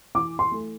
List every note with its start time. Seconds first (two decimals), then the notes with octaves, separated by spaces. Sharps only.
0.15 E3 D6
0.39 C6
0.51 A3